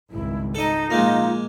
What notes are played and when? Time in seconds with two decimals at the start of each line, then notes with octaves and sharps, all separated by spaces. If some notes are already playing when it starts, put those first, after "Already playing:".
0.11 G#1 C#2 G2 E4
0.55 D#4 A4 D#5
0.90 A#2 F3 G#3 A#3 F4